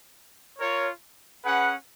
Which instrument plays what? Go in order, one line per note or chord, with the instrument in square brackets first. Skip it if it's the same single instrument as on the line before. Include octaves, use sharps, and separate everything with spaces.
[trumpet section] F4 A#4 C#5
C#4 G#4 B4 F#5